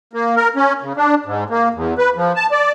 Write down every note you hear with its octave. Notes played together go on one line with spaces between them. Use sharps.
A#3
A#4
C#4
C#3
D4
G#2
A#3
E2
B4
F3
A5
D5